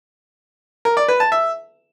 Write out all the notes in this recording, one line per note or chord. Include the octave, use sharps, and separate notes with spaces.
A#4
D5
B4
A5
E5